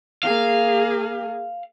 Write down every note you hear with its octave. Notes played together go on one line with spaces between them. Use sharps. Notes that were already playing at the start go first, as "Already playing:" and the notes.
A#3 G#4 F5